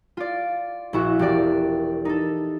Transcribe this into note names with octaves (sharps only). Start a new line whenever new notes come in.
F4 D5
A#1 E4 F#4
E1 G4 A#4 D5 D7
D#4 A4